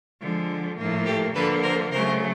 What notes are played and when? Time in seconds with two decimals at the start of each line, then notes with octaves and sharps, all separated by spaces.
0.19 D3 F3 G#3
0.76 A2 F3 A#3
1.05 G4 A4
1.34 D3 F3 A#3 A4 B4
1.62 A#4 C5
1.91 C#3 F#3 A3 A#4 C5